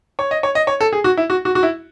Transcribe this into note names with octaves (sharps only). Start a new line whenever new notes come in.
C#5
D#5
C#5
D#5
C#5
A4
G#4
F#4
E4
F#4
F#4
F#4
E4